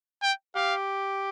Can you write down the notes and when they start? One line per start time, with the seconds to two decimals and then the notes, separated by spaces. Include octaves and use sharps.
0.23 G5
0.55 G4 F5